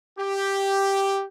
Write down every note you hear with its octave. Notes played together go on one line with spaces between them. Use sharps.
G4